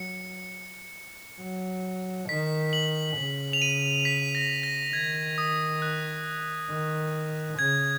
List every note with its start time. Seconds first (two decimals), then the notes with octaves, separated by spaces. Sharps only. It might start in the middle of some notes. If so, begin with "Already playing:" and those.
Already playing: F#3 C#7
1.41 F#3
2.29 D#3 B6
2.73 F#7
3.17 C#3
3.53 F7
3.62 D#7
4.05 B6
4.35 A#6
4.63 A#6
4.93 D#3 G#6
5.38 D#6
5.82 F#6
6.70 D#3
7.58 C#3 G#6